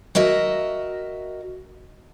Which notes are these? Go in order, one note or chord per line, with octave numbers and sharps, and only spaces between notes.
F#4 A#4 D#5 E5